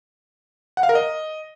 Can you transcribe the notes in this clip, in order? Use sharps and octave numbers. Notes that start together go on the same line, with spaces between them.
F#5
F5
A#4
D#5